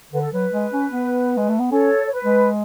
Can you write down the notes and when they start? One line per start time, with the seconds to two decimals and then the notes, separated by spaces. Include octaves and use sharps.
0.13 D3 B4
0.22 A4
0.32 F#3 B4
0.53 G#3
0.72 C#4
0.92 B3
1.38 G#3
1.49 A3
1.60 B3
1.71 C#4 A4 C#5
2.06 C#5
2.12 B4
2.25 G#3